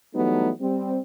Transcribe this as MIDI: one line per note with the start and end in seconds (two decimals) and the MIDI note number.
0.15 0.50 52
0.15 0.50 54
0.15 0.50 55
0.15 0.50 57
0.15 0.50 59
0.15 0.50 63
0.61 0.98 55
0.61 0.98 60